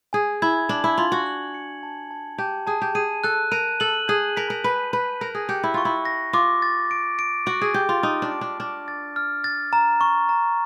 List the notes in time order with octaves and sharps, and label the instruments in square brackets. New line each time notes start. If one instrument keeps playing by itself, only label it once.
[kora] G#4 [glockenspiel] G#5
[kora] E4 [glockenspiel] G#6
[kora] D4 [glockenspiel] F#7
[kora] E4
[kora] F4 [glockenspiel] F#7
[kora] F#4
[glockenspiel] F#7
C#7
A5
A5
[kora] G4 [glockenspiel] A5
[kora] G#4 [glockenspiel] A5
[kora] G4
[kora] G#4 [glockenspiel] D#7
[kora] A4 [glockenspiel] F#6
[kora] A#4 [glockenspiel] D#7
[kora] A4 [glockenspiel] F#7
[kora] G#4 [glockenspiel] G6
[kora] A#4 [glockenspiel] B6
[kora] A#4
[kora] B4 [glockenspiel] G6
[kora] B4 [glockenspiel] G6
[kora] A#4 [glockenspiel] A#6
[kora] G#4
[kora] G4 [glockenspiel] C#7
[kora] E4
[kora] F4 [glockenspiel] C#6
[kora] E4
[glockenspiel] A#6
[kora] F4 [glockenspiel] D6
[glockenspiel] A6
D7
D7
[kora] F#4 [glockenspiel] D7
[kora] G#4
[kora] G4 [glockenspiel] D7
[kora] F4
[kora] D#4 [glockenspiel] F6
[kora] D4
[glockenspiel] D7
[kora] D4
[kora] D4 [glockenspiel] F6
[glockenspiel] A6
F6
A6
A#5
C#6
A#5